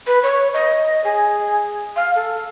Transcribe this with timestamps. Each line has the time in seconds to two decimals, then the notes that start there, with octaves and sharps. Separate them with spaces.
0.07 B4
0.23 C#5
0.54 D#5
1.04 G#4
1.96 F5
2.16 A4